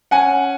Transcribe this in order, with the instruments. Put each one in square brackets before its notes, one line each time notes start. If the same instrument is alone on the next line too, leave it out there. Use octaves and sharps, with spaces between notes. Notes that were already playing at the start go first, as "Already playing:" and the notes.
[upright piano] C#4 F#5 G#5